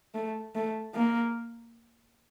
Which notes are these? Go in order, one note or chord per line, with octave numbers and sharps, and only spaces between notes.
A3
A3
A#3